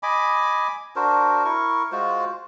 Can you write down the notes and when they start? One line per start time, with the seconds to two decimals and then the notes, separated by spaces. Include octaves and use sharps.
0.03 D#5 G#5 B5 D6
0.96 D4 F#4 A#4 C5
1.45 E4 A#4 C#6
1.92 G#3 F4 F#4 C5